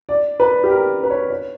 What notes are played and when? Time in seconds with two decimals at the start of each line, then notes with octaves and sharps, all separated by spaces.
0.09 D5
0.40 B4
0.64 G4
0.70 A#4
1.03 B4
1.10 C#5
1.30 C#5